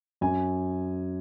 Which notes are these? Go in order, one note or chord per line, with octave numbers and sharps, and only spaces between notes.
F#2 G#5